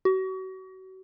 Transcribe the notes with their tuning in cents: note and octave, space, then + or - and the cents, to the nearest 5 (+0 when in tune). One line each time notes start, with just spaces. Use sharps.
F#4 +35